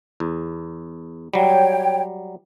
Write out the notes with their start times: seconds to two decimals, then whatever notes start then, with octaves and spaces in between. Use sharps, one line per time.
0.20 E2
1.34 F#3 G3 C#5 G5